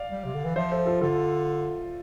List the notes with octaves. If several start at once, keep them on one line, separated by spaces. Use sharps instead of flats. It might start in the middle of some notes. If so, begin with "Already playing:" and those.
Already playing: D5 F5
G3
C3
D3
E3
F3 C5 E5
A4 C5
F4 A4
D3 F4 A4